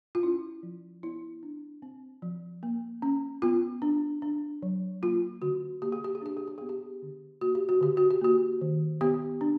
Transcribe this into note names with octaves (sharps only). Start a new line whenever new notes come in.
F4
C#4 E4
F3
B3 E4
D4
C4
F3
A#3
C#4
B3 F4
D4
D4
F#3
A#3 F4
D3 F#4
A#3 G4
G#4
G4
G#4
D4 G4
G#4
G4
B3 G#4
G4
D3
A#3 F#4
G4
F#4
D3 G4
F#4
G4
A#3 F#4
D#3
B3 G4
D4